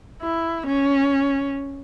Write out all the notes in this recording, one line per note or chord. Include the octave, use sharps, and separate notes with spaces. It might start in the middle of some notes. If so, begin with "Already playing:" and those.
E4
C#4